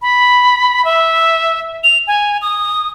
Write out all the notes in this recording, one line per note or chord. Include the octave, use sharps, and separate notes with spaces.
B5
E5
F7
G#5
D#6